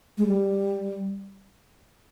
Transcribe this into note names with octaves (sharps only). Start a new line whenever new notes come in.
G#3
G3